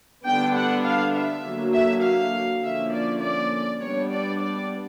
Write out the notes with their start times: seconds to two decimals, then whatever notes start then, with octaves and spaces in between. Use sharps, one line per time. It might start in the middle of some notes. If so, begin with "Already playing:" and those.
0.25 D3 G3 B3 D4 G5
0.55 F#5
0.85 F5
1.15 E5
1.44 D3 F#3 A#3
1.73 E5
2.03 F5
2.63 D3 F3 A#3 C#4 E5
2.92 D5
3.21 D5
3.80 G3 B3 D4 C#5
4.10 D5
4.40 D5